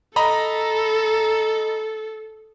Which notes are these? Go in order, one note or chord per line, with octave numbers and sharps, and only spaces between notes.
A4 D#5 A#5 B5